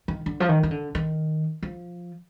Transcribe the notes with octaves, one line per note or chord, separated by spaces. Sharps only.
D#3
D3
F3
D#3
D#3
D3
D#3
F3